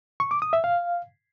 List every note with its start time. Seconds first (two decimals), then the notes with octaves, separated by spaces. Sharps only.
0.20 C#6
0.31 D6
0.42 D#6
0.53 E5
0.64 F5